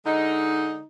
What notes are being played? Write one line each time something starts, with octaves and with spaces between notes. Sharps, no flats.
D3 G#3 D#4